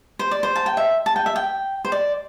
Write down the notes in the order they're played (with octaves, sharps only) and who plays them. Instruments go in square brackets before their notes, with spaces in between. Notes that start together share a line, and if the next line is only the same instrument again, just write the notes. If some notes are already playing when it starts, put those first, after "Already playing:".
[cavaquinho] C5
D5
C5
A5
G5
E5
A5
G5
E5
G5
C5
D5